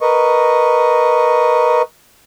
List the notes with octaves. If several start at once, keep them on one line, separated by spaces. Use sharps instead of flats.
A#4 B4 D#5 C#6